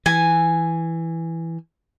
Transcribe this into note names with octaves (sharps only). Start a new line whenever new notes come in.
E3 G#5